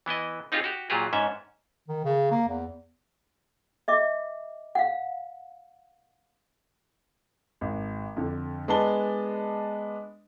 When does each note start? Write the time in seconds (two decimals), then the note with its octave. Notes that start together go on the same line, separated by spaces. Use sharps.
0.06 E3 B3 E4 D#5
0.52 C4 D#4 F4 G4 G#4
0.64 F#4 G4
0.90 A#2 F#3 F4 G4 G#4
1.13 G#2 C#4 D4 E5
1.88 D#3
2.05 C#3
2.31 A#3
2.48 E2
3.88 D#5 E5 D6
4.75 F5 F#5
7.61 G#1
8.16 F2 D3
8.68 G#3 B3 D4 A5 G7